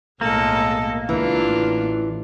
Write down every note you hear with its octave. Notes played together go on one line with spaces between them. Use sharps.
B1 A2 G#3 A#3 A4
C#2 E3 D4 F4
A1